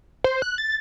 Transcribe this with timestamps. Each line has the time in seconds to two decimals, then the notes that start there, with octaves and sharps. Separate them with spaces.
0.24 C5
0.42 F#6
0.58 A6